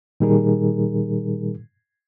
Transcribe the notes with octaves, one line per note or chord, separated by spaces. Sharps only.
A#2 D#3 G3 D#4 G#4 A#4